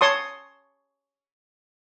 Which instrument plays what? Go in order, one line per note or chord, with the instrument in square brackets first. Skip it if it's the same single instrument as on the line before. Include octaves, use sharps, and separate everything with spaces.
[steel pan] C#5 A5 C6 C#6 D#6